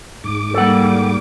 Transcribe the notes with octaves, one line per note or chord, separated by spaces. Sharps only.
G#2 D6
G3 A#3 A4 F#5